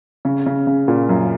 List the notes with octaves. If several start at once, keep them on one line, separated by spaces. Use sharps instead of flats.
C#3
C#3
C#3
A#2
F#2